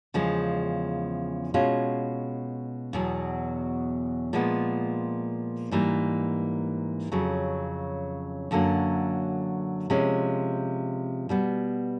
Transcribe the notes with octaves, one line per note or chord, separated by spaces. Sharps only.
E2 C#3 F3 G#3
B2 G#3 C#4 F4
E2 B2 F#3
A#2 F3 G#3 B3
G#2 E3 G3 A#3
F2 C#3 F#3
F#2 D3 F#3 A#3
C3 F3 G#3 C#4
B2 G3 B3